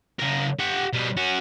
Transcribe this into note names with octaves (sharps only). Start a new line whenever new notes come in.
C#3 A#4
G4 F#5
B2 G3
C#4 F#4